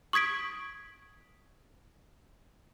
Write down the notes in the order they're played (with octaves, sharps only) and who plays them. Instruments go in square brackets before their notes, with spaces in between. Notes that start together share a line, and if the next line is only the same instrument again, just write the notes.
[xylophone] C#6 D#6 G#6 B6 D7